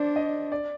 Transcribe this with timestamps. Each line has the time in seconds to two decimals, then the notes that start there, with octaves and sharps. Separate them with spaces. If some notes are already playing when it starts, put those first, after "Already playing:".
Already playing: D4 C5 D5
0.16 D#5
0.52 D5